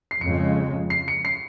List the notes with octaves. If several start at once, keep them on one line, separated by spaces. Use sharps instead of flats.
C7
F2 C#3 G#3 C#7
C7
C#7
C7